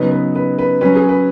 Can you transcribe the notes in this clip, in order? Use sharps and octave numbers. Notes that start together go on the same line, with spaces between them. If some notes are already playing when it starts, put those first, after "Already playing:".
Already playing: C#3 F#3 B3 D#4 B4
B4
B4
B4
F#3 C#4 B4
G#4
B4